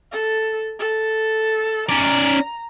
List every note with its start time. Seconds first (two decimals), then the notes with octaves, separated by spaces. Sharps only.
0.12 A4
0.80 A4
1.89 C#4 D5 A#5